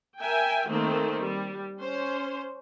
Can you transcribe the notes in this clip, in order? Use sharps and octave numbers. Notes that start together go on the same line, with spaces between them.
A#4 E5 G5 G#5
D#3 A3 A#3 C4
G3
C#4 C5